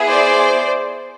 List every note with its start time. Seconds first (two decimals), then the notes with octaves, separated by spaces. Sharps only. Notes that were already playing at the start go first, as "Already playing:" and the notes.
Already playing: B3 E4 G#4
0.08 C5 D5